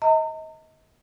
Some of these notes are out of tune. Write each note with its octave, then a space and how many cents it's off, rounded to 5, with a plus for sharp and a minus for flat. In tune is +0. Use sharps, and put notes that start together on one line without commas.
D#5 +30 A#5 -40